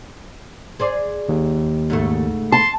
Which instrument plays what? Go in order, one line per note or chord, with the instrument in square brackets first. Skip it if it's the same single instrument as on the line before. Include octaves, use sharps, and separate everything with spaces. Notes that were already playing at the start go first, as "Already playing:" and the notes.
[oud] G#4 C5 D5
[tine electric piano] D#2
[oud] G#2 C#3 A3
[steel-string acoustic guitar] A5 [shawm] C6